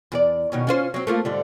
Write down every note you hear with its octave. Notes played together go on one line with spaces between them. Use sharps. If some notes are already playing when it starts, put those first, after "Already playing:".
E2 G4 D5
B2 D#3 C#4
C#4 F4 C5
F#3 C4
A3 A#3 F4
G#2 D3 G3